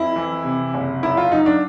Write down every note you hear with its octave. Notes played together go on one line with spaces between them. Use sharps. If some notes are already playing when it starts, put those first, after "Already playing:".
Already playing: F2 E4
E3
C3
F#1
F#2 E4
F4
F#3 D#4
D4